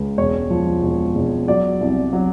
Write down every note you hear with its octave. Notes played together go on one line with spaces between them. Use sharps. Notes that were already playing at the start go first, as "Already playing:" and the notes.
Already playing: C#2
E1 C#5
F3
E1
E1
F#3 D5
C2
F#3